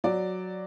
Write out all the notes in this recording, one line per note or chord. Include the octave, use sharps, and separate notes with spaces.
F#3 D5